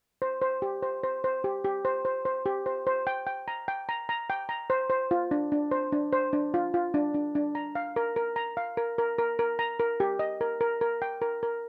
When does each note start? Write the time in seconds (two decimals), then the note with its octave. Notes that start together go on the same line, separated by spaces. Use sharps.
0.22 C5
0.42 C5
0.62 G4
0.83 C5
1.04 C5
1.24 C5
1.44 G4
1.64 G4
1.85 C5
2.05 C5
2.25 C5
2.46 G4
2.66 C5
2.87 C5
3.07 G5
3.27 G5
3.48 A#5
3.68 G5
3.89 A#5
4.09 A#5
4.30 G5
4.49 A#5
4.70 C5
4.90 C5
5.11 F4
5.31 D4
5.52 D4
5.71 C5
5.92 D4
6.12 C5
6.33 D4
6.54 F4
6.74 F4
6.94 D4
7.14 D4
7.35 D4
7.55 A#5
7.75 F5
7.96 A#4
8.16 A#4
8.36 A#5
8.57 F5
8.77 A#4
8.98 A#4
9.18 A#4
9.39 A#4
9.59 A#5
9.79 A#4
10.00 G4
10.19 D#5
10.41 A#4
10.61 A#4
10.81 A#4
11.02 G5
11.22 A#4
11.43 A#4